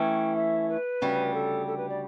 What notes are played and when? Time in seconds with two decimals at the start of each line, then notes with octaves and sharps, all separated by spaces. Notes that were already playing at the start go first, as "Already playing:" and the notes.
Already playing: E3 A3 C#4 G5
0.36 E5
0.69 B4
1.02 D2 C#3 G3
1.34 A4
1.67 A4
1.78 B4
1.89 D5